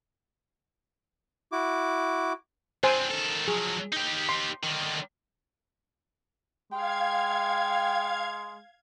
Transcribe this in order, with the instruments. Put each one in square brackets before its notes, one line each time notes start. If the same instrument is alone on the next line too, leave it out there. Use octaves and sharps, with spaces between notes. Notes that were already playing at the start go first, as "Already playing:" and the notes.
[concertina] E4 F#4 D6
[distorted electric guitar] C4 D4 [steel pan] C5 G#5
[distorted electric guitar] D#3 A4
[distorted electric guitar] F3 F#3 [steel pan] G#4
[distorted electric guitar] D#4 G4
[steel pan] C6
[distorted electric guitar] D3 D#3
[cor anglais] G#3 [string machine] F5 G#6 [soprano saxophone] G5